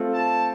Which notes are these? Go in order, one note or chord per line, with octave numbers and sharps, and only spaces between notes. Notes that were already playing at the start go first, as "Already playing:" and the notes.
Already playing: A3 C4 F4 A4
A5